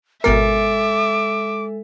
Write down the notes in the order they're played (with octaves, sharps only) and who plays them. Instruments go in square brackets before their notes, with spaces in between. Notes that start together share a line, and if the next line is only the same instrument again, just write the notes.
[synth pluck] G#1 B2 A#4 [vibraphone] G#3 A4 [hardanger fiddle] E5 [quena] D6